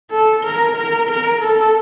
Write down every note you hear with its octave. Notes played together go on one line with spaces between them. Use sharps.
A4
A#4
A#4
A#4
A4